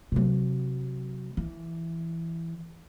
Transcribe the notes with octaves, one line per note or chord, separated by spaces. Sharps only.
C3 F#3
E3